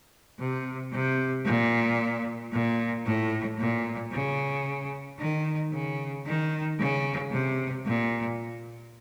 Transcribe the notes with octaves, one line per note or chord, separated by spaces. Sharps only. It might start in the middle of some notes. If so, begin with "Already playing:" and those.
C3
C3
A#2
A#2
A2
A#2
C#3
D#3
C#3
D#3
C#3
C3
A#2